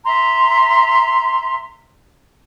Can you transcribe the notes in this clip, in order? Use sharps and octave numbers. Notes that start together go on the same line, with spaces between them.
E5 A#5 C6